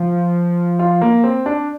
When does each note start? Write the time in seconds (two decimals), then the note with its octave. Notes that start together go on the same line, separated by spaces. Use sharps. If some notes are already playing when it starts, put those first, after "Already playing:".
Already playing: F3
0.79 F4
1.01 A#3
1.24 C4
1.46 D4